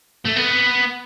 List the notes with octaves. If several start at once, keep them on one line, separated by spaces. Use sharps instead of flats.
A3
B3